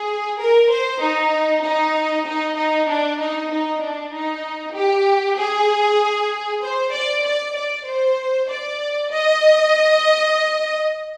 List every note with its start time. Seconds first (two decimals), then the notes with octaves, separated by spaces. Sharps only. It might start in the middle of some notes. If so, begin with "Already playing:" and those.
Already playing: G#4
0.39 A#4
0.70 C5
1.01 D#4
1.63 D#4
2.26 D#4
2.56 D#4
2.88 D4
3.20 D#4
3.51 D#4
3.81 D4
4.12 D#4
4.74 G4
5.38 G#4
6.62 C5
6.93 D5
7.25 D5
7.55 D5
7.86 C5
8.48 D5
9.11 D#5